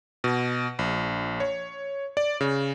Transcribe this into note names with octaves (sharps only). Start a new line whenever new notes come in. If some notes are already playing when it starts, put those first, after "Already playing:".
B2
A#1
C#5
D5
C#3